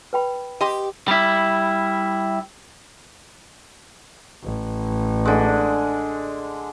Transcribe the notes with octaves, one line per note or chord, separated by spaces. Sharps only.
B4 G5 B5
G4 D#5 C6
G3 E4
A1
D3 G#3